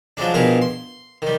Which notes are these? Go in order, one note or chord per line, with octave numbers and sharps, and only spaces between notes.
F3 F#3 G#3 D4
G2 B2 F3 G#4 A#4
C6
D#3 G3